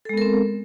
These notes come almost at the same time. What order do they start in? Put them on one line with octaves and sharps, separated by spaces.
A4 G#3 B3 A#4 C4